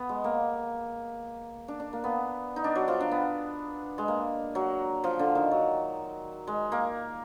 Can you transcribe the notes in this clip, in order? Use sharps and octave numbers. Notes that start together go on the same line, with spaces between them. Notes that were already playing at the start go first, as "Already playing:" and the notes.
Already playing: B3
G#3
A#3
D4
D4
A#3
B3
D#4
D4
F#3
F3
D4
B3
G#3
A#3
F#3
F3
D3
D#3
F#3
G#3
A#3